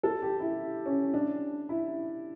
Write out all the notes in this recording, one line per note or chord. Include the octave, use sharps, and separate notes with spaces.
A4
G4
E4
C#4
D4
E4